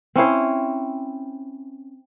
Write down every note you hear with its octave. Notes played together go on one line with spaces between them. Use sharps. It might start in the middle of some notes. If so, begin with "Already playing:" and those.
C4 C#4 E4 C5